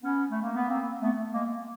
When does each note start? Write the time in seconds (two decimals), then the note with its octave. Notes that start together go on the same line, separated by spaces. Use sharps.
0.02 B3 C#4
0.30 A3
0.42 A#3
0.55 B3
0.68 A#3 C4
1.01 A3 B3
1.33 G#3 A#3